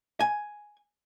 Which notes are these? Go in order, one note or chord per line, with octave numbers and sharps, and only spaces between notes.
G#5